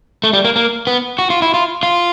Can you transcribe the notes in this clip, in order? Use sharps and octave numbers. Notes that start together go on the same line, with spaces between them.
A3
G3
A#3
A#3
B3
F#4
F4
E4
F4
F4